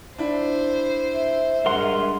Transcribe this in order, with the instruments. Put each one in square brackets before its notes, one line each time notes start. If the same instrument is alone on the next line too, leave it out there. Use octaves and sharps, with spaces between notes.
[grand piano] D4 E4 [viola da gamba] C5
[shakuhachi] E5
[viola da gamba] G2 G#3 [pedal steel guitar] A#4 C6 [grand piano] F#5